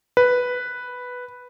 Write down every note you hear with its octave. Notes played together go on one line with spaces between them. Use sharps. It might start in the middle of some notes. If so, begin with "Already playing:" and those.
B4